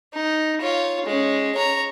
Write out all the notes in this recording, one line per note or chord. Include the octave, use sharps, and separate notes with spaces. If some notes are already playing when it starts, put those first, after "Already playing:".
D#4
F4 C#5
G#3 C#4
C#5 A#5